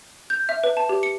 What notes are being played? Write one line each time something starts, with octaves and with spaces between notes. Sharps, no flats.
G6
E5
B4
A5
G4
C#7